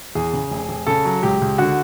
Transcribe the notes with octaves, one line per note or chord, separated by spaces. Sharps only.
E2 G#4
C#3
F1
F1
C#3 A4
F#3
C#2 G4
C#2
D3 F#4